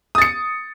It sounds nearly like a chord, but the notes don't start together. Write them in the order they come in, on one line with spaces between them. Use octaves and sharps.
D#6 A6 C#7